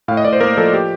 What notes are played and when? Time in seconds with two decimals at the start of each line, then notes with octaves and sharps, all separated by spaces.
0.08 A2 F5
0.17 D#5
0.25 A2 D5
0.33 C5
0.41 A#3 A#4
0.57 F3 A4
0.74 G4